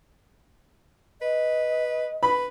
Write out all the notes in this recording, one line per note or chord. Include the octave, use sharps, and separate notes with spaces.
B4 D#5
B4 B5